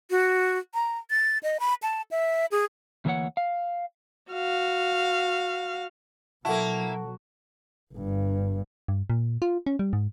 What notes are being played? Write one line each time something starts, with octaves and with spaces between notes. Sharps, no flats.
F#4
A#5
A6
D#5
B5
A5
E5
G#4
D2 E3 A#3 E4 C#5 F#5
F5
F#4 F5
B2 F#3 A#3 E4 F#4 A4 A5
G1 G2
G2
A#2
F4
C#4
G3
G#2